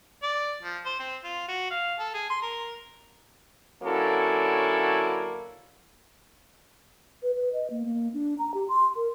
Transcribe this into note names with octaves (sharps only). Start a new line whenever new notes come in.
D5
F3
C5
C4
F4
F#4
F5
A4
G#4
C6
A#4
D3 F#3 A#3 C#4 E4 A4
B4
B4
D#5
A#3
A#3
D4
A#5
G4
C6
A#4